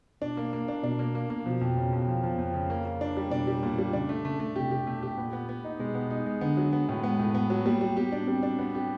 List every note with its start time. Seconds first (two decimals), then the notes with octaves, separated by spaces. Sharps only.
0.22 B2 D4
0.37 A#3
0.53 A#3
0.68 D4
0.84 B2 D4
0.99 A#3
1.15 A#3
1.30 A#3
1.45 B2 F3
1.61 F2
1.77 C#3
1.92 F2
2.07 F3
2.23 F3
2.38 F2
2.54 C#3
2.70 A#3
2.85 A#3
3.01 D4
3.17 G3
3.31 B2 D4
3.47 G3
3.63 A#2
3.78 G3
3.93 C#3 D4
4.09 A3
4.25 C#3 A3
4.40 A3
4.56 C3 G4
4.71 G4
4.86 B2 A3
5.03 G4
5.18 A#2 B3
5.33 B3
5.49 B3
5.64 D#4
5.79 B2 G#3
5.95 B3
6.11 D#4
6.26 G#3
6.41 D3 B3
6.57 F#3
6.73 B3
6.89 A2
7.03 G#3 B3
7.19 A2
7.35 B3
7.50 F#3
7.66 G3 A#3
7.81 G3
7.97 B3 G4
8.12 D4
8.27 G3 C4
8.43 D4
8.59 B3
8.75 G4